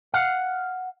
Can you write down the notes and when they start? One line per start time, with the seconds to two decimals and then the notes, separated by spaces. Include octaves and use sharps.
0.14 F5 F#5